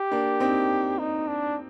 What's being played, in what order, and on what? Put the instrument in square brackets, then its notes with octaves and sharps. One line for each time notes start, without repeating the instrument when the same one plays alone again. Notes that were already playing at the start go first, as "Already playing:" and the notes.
Already playing: [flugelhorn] G4
[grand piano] A#3 D4
C4 D#4
[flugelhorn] D#4
D4